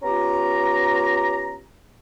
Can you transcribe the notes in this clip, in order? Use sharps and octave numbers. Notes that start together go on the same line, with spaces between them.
B3 C#4 F4 G4 A#5